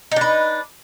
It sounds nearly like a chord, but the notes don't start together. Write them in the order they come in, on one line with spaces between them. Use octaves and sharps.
D#4 D4 B4